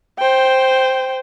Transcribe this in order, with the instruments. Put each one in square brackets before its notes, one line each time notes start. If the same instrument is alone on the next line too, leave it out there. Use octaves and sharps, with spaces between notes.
[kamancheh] C5 G5